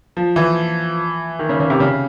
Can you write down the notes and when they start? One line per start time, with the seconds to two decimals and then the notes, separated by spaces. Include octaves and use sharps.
0.17 F3
0.36 E3
1.39 D#3
1.49 C#3
1.60 C#3
1.70 C3
1.80 C#3